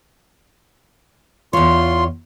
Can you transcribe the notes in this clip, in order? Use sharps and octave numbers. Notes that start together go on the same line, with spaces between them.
E2 F4 C#5 C6